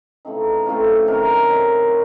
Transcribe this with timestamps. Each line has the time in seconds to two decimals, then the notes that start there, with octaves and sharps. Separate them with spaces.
0.25 C#3 E3 A3 C4 D#4
0.66 C#3 E3 A3 C4 F4
1.07 C3 D#3 F#3 A#4
1.49 C3 D#3 F#3 C5
1.89 B2